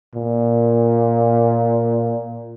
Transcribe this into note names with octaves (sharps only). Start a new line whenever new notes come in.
A#2